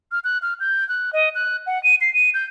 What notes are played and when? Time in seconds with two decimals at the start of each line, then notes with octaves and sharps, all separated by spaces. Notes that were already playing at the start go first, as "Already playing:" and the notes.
0.12 F6
0.24 F#6
0.42 F6
0.60 G6
0.89 F#6
1.13 D#5
1.35 F#6
1.67 F#5
1.83 D#7
2.01 C7
2.14 D#7
2.34 G6